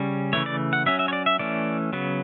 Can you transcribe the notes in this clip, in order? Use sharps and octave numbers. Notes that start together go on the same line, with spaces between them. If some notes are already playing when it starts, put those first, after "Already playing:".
Already playing: C#3 G3 C#4
C#3 E3 A3 C#5
D5
F#5
F#3 C#4 E5
E5
C#5
D5
E5
E3 A3 C#4 D5
C#3 F#3 B3